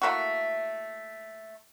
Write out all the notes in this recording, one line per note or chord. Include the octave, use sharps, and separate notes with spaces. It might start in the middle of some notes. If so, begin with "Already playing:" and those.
A3 A#3 E4 F#4